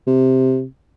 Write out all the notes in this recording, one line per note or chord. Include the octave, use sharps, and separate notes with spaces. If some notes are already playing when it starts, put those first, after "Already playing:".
C3